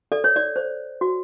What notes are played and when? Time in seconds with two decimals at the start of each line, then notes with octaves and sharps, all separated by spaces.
0.12 A4 D5
0.24 C#5
0.36 D5
0.56 C5
1.01 F#4